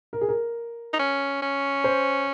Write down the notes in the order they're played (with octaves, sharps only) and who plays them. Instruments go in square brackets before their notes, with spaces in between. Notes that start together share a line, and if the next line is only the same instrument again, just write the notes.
[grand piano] A#4
G#4
A#4
[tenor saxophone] D#4
C#4
C#4
[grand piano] C5